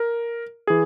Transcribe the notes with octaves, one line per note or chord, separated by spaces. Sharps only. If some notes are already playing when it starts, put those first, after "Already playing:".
Already playing: A#4
E3 G#4